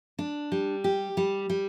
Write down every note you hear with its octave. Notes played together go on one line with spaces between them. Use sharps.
D4
G3
G4
G3
G3